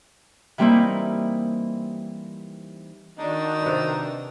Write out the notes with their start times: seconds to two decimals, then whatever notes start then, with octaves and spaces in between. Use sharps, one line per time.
0.58 E3 G3 A#3 C4 D#4 E4
3.18 D#3 D4 D#4 F#4
3.62 C3 B4